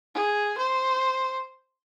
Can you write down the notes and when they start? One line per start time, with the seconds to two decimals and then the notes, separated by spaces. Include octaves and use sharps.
0.15 G#4
0.58 C5